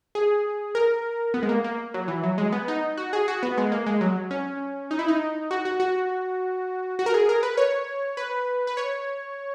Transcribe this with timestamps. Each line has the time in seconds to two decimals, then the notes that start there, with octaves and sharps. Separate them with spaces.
0.15 G#4
0.75 A#4
1.34 B3
1.43 G#3
1.49 A#3
1.64 A#3
1.94 F#3
2.08 E3
2.23 F#3
2.38 G#3
2.52 B3
2.68 D#4
2.97 F#4
3.13 G#4
3.28 F#4
3.43 B3
3.58 G#3
3.72 A#3
3.86 G#3
4.01 F#3
4.31 C#4
4.91 D#4
4.99 E4
5.08 D#4
5.51 F#4
5.65 F#4
5.80 F#4
6.99 F#4
7.06 A#4
7.14 G#4
7.29 A#4
7.43 B4
7.57 C#5
8.17 B4
8.67 B4
8.77 C#5